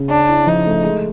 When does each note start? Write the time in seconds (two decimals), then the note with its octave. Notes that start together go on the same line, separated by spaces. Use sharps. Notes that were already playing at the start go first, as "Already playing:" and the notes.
Already playing: C#3
0.09 C#4 D4
0.29 E4
0.47 F3 D#4
0.66 A3
0.84 G#3